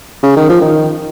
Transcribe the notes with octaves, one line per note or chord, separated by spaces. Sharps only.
C#3
D#3
F3
D#3